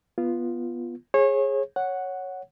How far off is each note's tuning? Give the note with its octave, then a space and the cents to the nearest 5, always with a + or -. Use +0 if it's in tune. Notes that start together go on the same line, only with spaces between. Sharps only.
B3 -10 F4 -15
G#4 +0 C#5 -30
C#5 +0 F#5 +0